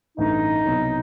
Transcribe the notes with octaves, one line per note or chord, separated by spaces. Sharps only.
A1 G2 E3 A3 D#4
C2 B2 F#3 B3